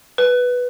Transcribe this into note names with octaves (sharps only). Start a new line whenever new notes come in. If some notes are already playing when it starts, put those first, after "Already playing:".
B4